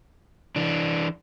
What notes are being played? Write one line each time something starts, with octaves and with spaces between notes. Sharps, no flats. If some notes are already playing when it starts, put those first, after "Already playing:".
E3 D4